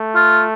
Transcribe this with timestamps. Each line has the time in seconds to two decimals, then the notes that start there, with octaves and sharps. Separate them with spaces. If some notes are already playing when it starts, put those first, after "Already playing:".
Already playing: A3
0.15 F4